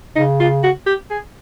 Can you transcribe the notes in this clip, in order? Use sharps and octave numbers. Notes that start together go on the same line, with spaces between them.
C#3 D#4
F4
F#4
G4
G#4